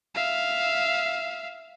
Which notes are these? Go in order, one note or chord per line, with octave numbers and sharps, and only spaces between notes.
E5 F5